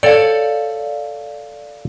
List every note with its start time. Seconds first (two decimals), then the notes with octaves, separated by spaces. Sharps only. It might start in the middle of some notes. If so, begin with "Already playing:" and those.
0.03 A4 C#5 D5 F5 G5